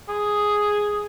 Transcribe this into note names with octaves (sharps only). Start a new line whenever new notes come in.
G#4